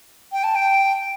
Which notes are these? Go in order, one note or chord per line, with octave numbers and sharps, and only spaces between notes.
G5
A5
G5